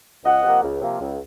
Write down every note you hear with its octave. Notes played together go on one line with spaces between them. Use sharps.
C#2 D#5 F#5
C3 F3 A#3
C#2
C3 F3 A#3
C#2